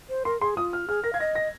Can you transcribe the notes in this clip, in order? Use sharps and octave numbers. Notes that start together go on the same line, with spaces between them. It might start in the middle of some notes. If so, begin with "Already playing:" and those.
C5
A#4 C6
G#4 C6
F4 D#6
F6
G#4 F6
A#4 A#6
F5 G#6
D#5 A#6
A#6